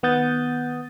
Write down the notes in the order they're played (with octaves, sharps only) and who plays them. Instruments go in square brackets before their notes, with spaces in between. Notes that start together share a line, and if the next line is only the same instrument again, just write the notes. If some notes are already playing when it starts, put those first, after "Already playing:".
[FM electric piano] D#3 B3 F#5 D#6 G6 A6